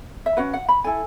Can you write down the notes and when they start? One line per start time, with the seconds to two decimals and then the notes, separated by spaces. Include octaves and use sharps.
0.26 E5
0.37 C#4 F#4 B4 F#5
0.54 F#5
0.69 B5
0.84 E4 A4 G#5